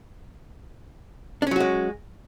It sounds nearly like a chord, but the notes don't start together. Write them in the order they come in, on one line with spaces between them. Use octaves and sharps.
D4 C#4 F#3 F#4 G#3